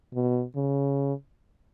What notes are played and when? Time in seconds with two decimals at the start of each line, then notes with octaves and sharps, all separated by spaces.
0.14 B2
0.56 C#3